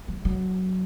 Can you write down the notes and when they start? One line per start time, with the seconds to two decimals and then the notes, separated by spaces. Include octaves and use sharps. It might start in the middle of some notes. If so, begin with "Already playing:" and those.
0.08 F#3
0.25 F#3